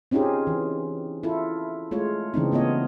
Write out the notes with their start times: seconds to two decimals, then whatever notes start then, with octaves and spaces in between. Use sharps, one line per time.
0.11 C4 C#4 D#4 F4 G4 G#4
0.47 E3
1.23 E4 F4 A4
1.91 G#3 A3 F4 C#5
2.34 C#3 E3 G#3 C4 D4 D#4
2.52 A3 B3 F4 C#5 D#5